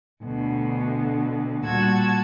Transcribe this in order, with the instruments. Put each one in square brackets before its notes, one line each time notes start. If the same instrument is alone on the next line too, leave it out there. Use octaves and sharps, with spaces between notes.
[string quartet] D2 B2 D3
A#2 G3 F#4 A5 E6 G#6